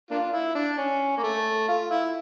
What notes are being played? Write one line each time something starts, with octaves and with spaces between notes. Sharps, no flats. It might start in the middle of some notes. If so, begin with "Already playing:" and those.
A#3 D4 F4
E4
D4
C#4
A#3
A3
F4
E4